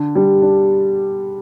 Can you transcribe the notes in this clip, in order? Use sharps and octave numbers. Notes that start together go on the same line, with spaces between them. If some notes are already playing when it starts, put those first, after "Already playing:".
Already playing: D3
G3
D4